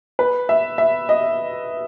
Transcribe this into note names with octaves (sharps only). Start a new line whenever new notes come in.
B4
E5
E5
D#5